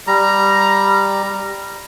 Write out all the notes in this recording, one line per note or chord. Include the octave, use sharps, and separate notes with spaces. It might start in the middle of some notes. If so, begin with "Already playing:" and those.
G3 A#5